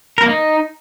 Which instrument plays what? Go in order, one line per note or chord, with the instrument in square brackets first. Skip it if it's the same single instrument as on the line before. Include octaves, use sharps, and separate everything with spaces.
[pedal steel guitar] A#4
A#3
D#4